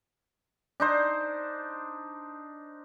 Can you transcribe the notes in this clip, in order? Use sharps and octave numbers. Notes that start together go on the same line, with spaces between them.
D4 D#4 C5